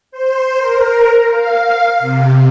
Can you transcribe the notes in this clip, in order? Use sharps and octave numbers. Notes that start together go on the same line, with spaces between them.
C5
A#4
F5
C3